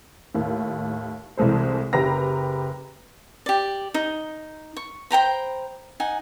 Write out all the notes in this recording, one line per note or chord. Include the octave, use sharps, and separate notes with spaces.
D#2 A2
C2 E3 G#3 A4 C5
F#1 G4 B4 A#5 A#6
G4 D5
D#4
C#6
C5 G5 A#5 B5
D#4 F#5 G#5